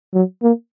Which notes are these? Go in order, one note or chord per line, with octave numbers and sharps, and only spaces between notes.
F#3
A#3